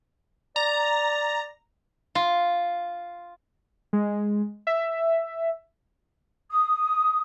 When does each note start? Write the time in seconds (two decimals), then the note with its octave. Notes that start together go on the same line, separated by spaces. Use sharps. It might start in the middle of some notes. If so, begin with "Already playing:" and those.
0.56 D5 A#5
2.15 F4
3.93 G#3
4.67 E5
6.50 D#6